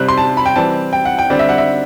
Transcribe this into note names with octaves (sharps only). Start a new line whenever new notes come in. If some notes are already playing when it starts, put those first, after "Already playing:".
Already playing: C3 G3 C4 F#6
C6
A5
B5
G5
E3 G3 C4 A5
G5
F#5
G5
D3 G3 C4 D5
E5
F#5
E5